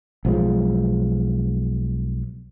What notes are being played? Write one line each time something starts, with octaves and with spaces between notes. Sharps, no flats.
B1 F3 G#3